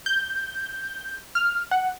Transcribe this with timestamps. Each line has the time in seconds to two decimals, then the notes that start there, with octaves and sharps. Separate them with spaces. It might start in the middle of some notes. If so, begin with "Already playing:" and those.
0.06 G6
1.35 F6
1.71 F#5